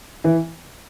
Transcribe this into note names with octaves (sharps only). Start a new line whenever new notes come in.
E3 E4